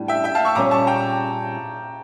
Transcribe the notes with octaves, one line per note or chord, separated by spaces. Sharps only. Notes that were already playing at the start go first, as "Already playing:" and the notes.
Already playing: A2 G3 D4
E5 G5
E5 G5
F5 A5
C#6 E6
A#2 G3 C#4 F4 A#5 D6
A5 C#6
G5 A#5